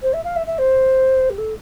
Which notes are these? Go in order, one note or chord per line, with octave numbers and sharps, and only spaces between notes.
C5
E5
F5
E5
E5
C5
G4
A4